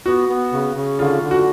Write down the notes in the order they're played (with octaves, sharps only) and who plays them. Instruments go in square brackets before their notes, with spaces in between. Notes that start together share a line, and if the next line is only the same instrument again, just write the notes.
[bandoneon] B3 [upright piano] F#4
[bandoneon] B3
C#3
C#3
[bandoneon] D3 [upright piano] F4
[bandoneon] D3
[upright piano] F#4